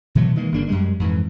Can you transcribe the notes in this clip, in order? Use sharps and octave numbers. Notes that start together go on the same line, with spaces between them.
B2 E3 F#3 A3
D#3 E3 G#3 A#3
G1 C#3 A#3 D4
F#2 G3 G#3
F2 G#2 E3